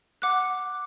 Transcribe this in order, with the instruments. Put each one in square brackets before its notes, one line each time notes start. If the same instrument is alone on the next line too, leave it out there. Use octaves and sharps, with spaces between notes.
[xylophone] F#5 D6 F#6